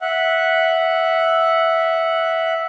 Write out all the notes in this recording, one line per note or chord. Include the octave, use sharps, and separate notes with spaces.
E5 F#5